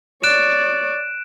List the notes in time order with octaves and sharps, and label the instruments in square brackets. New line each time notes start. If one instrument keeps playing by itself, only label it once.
[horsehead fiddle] C#5 D5 [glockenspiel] F#6 D7 E7